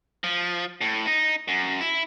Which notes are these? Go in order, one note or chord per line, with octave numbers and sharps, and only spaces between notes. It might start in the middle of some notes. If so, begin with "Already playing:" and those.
F3
A2
D#4
F#2
E4